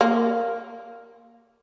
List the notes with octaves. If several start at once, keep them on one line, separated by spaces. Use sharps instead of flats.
A#3